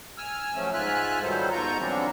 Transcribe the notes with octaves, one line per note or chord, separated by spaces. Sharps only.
G#5 E6 F6
F3 F#3 A3 C#4
G#2 F4 E5 G#5 F6 F#6
D#3 F#3 G3 B3 A4 C5
G#2 B2 F4 A#5 C#6 G6
D3 E3 F#3 G3 C4 D4